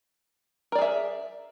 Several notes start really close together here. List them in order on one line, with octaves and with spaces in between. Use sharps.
A#4 D5 G#4 E5